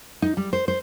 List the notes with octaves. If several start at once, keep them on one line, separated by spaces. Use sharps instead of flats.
D#4
G3
C5
C5